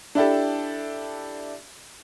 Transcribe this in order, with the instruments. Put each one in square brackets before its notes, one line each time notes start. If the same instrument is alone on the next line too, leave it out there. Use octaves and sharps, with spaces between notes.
[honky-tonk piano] D4 E4 G4 A4